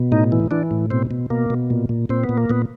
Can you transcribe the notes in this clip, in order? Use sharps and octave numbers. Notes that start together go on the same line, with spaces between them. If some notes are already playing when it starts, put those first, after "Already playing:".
Already playing: B2
A2 D#4
E3
E3 D4
A2
B2 C4
B2
B2 A#3
B2
A#2
A#2
A#2 C4
B3
A#2
A#3
A#2 B3